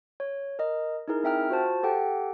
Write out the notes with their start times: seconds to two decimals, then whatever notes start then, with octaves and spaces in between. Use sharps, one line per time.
0.20 C#5
0.59 A#4 D#5
1.08 D#4 E4 G#4 A#4
1.24 C4 E5 G5 F6
1.49 F4 F#4 C5 A5
1.83 G4 A4 F#5 G5